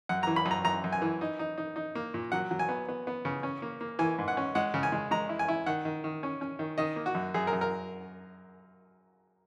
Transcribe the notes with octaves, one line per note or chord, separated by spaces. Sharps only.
F#2 F#5
E3 A#5
B5
F#2
A#5
F#2 A#5
F#2
G#5
E3
D#4
D#4
D#4
D#4
A#3
A#2
F#3 F#5
F#3
G#5
B3
B3
B3
C#3
C#4
A#3
A#3
E3 G#5
G#2
F#5
C#4
G#3 F#5
C#3
G#5
G#3
G#3 A#5
E4
G#5
E4
D#3 F#5
D#3
D#3
C#4
C#4
D#3
D#3 D#5
A#3
F#4
F#2
F#2 G#4
A#4
F#2
A#4